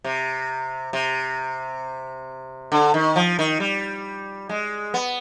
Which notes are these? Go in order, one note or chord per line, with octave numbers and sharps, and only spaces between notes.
C3
C3
D3
D#3
F3
D#3
G3
G#3
B3